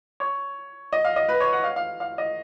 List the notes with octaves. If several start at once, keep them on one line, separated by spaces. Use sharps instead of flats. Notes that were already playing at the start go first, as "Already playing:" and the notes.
C#5
D#5
F5
D#5
B4
C#5
F#5
F5
F5
F5
D#5